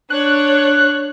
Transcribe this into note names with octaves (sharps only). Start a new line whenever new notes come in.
D4 C#5 F#6